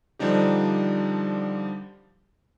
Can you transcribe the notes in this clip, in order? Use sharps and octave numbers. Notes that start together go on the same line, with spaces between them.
D3 F3 G3 D4 D#4 G4